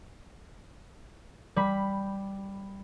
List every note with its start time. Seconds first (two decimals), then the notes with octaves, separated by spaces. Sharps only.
1.56 G3 B5